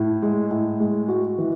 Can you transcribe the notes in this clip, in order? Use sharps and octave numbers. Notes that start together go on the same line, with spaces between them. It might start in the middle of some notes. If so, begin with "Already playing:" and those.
Already playing: A2
G#3
A2
G#3
F#4
E3